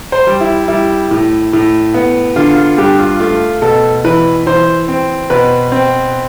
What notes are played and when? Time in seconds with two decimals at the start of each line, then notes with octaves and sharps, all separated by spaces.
0.12 C5
0.27 G3
0.41 E4
0.68 G3 E4
1.11 A2
1.53 A2
1.94 B3
2.36 D3 F4
2.57 F4
2.78 G2 G4
2.99 F4
3.20 A3 F4
3.62 B2 A4
4.04 E3 B4
4.46 E3 C5
4.88 C4
5.30 B2 B4
5.72 C4